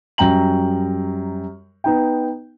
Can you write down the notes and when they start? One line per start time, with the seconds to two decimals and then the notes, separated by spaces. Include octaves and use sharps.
0.18 F#2 G3 G5 A#5 F#7
1.84 B3 D#4 G5